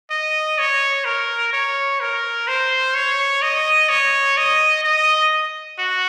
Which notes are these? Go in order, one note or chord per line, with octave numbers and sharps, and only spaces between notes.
D#5
C#5
A#4
C#5
A#4
C5
C#5
D#5
C#5
D#5
D#5
F#4